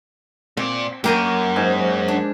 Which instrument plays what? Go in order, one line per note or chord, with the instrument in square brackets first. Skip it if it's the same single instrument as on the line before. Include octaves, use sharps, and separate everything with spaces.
[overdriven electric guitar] A#2 D5 [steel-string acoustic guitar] C4
[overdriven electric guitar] F#2 [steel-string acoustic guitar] A#3 [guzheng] G4 A#4 G#5
[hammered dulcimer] G#2
[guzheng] D4